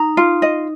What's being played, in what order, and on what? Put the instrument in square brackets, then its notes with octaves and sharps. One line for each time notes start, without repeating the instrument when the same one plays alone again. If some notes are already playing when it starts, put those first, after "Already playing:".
Already playing: [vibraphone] D#4 [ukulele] A#5
[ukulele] F4
D#5